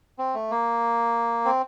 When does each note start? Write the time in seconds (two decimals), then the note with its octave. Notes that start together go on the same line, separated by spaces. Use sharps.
0.19 C4
0.35 A3
0.51 A#3
1.45 C4